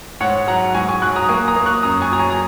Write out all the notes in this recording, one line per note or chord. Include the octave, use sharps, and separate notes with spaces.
G#2 C#5 F#5
F#3 F#5 A#5
G#2 G#5 C#6
G#5 C#6
F#3 C#6 F#6
A#5 D#6
A#3 G#5 C#6
A#5 D#6
A#3
C#6 F#6
F#2 A#5 D#6
G#5 C#6
F#3 A#5
G#5 C#6
A#5